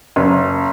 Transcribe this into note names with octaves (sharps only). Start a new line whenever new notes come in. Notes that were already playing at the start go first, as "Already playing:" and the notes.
F#1